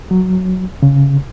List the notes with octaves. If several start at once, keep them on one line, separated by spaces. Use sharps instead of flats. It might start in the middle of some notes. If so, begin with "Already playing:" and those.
F#3
C#3